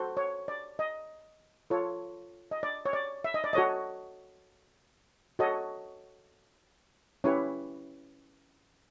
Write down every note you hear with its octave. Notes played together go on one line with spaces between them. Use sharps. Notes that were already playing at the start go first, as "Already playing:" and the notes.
Already playing: F#4 A4 C5
C#5
D5
D#5
F4 A4 C#5
D#5
D5
C#5
D5
E5
D#5
D5
F#4 A4 C#5 D#5
F#4 A4 C#5 D#5
C#4 E4 G4 B4 C#5